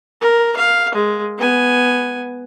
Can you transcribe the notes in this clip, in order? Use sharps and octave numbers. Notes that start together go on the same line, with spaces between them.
A#4
F5
G#3
B3 G#5